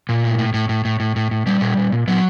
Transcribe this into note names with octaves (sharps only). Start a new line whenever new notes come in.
A#2
A2
A2
A2
A2
A2
A2
A2
A2
A#2 G3
A#2
A#2
A#2
A#2 F#3